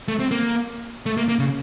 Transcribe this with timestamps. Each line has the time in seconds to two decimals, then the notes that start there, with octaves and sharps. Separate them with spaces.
0.08 A3
0.20 C4
0.31 A#3
1.06 A3
1.17 A#3
1.29 A#3
1.39 C#3